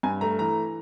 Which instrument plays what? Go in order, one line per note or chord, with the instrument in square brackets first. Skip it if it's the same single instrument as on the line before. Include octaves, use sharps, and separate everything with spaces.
[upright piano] G2 G#5
A3 A#5
E3 A#5